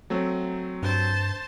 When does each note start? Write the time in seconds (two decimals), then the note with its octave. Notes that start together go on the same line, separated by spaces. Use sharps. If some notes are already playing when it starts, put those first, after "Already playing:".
0.10 F#3 A3 C4
0.83 G2 C5 A5